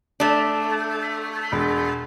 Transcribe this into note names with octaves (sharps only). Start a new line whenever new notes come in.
A3 D4
E1